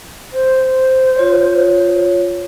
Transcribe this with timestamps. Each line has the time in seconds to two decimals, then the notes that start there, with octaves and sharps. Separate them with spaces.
0.32 C5
1.16 F4 C#5